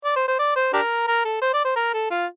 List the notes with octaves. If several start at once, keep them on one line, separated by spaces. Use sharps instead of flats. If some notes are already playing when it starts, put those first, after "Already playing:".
D5
C5
C5
D5
C5
D4 G4 A#4
A#4
A4
C5
D5
C5
A#4
A4
F4